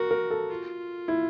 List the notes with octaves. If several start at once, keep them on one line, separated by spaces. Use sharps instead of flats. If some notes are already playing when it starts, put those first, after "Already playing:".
Already playing: F#4 A#4
A#4
A4
F4
E4